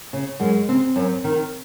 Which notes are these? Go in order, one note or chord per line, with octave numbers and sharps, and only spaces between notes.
C#3
F#2 G#3
C#3 C4
F#2
D#3